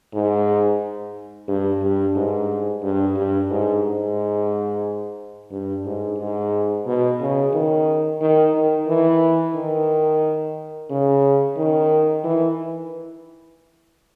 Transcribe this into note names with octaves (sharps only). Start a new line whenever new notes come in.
G#2
G2
G2
G#2
G2
G2
G#2
G#2
G2
G#2
G#2
B2
C#3
D#3
D#3
D#3
E3
D#3
C#3
D#3
E3